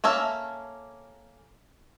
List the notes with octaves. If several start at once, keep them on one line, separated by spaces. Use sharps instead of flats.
A#3 C#4 A4 E5